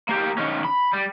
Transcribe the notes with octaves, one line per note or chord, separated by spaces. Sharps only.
A#3 G4
D#3 C#4
B5
G3